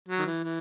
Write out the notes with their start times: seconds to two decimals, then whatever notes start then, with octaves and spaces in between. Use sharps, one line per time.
0.08 F#3
0.19 D#3
0.26 E3
0.44 E3